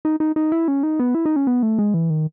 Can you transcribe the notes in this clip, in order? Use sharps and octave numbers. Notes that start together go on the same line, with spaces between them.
D#4
D#4
D#4
E4
C#4
D#4
B3
E4
D#4
C#4
B3
A3
G#3
E3
D#3